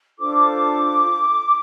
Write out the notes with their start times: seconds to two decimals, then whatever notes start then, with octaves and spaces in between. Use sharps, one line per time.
0.19 D4 F4 A4 C5 D6